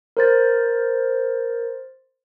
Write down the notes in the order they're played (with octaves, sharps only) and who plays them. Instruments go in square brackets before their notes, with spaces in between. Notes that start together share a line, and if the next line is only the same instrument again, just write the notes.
[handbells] A#4 C5 A6